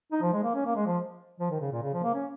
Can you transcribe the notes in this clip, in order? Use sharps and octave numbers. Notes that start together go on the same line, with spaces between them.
D#4
F3
G#3
A#3
C#4
A#3
G#3
F3
F3
D#3
C#3
A#2
C#3
F3
A#3
C#4